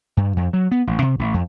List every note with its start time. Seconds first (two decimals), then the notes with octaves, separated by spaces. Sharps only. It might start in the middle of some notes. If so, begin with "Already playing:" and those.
0.17 G2
0.37 F2
0.53 F#3
0.71 B3
0.87 A1
1.02 C3
1.19 A1
1.34 F2